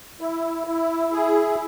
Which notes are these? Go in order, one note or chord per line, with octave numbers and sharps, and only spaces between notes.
E4
E4
G#4